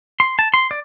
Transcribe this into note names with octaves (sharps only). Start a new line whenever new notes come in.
C6
A5
C6
D5